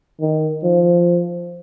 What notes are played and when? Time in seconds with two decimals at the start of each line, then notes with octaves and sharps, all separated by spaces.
0.20 D#3
0.63 F3